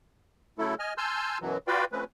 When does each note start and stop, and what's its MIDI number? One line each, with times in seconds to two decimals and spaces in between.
0.58 0.75 49
0.58 0.75 54
0.58 0.75 57
0.58 0.75 64
0.58 0.75 69
0.79 0.94 75
0.79 0.94 80
0.79 0.94 89
0.98 1.38 80
0.98 1.38 81
0.98 1.38 84
0.98 1.38 88
0.98 1.38 89
0.98 1.38 91
1.41 1.57 42
1.41 1.57 47
1.41 1.57 52
1.41 1.57 54
1.67 1.85 65
1.67 1.85 66
1.67 1.85 71
1.67 1.85 74
1.67 1.85 77
1.67 1.85 79
1.92 2.04 53
1.92 2.04 57
1.92 2.04 60
1.92 2.04 61
1.92 2.04 71